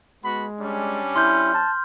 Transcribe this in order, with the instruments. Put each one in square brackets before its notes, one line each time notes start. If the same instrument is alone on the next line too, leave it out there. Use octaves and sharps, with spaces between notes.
[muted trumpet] G#3 [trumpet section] B3 F#4 B5
[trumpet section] G3 C#4 D4
[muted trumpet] E4 [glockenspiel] C6 F6 G6
[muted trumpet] A5